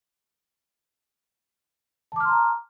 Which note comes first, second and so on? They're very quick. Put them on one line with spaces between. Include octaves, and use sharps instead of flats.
A5 D6 F6 C6 A#5